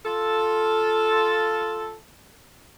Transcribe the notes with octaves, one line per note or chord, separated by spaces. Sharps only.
F4 A4